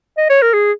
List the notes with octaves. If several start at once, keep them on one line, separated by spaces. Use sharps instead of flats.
D#5
C#5
A#4
G#4